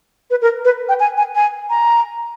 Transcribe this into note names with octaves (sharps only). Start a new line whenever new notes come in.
B4
A#4
B4
G5
G#5
G#5
G#5
A#5